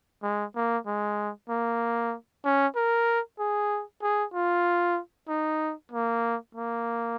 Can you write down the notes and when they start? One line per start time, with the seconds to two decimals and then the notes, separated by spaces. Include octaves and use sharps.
0.23 G#3
0.56 A#3
0.87 G#3
1.50 A#3
2.45 C#4
2.76 A#4
3.39 G#4
4.02 G#4
4.34 F4
5.29 D#4
5.92 A#3
6.55 A#3